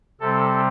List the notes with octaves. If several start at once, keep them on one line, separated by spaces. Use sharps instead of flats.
C3 G3 C4 A4